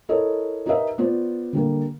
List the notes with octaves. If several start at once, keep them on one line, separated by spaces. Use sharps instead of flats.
E4 A4 A#4 C#5 D#5
D#4 G4 A#4 B4 D#5 E5
B3 F4 C5 D5
D3 G3 A#3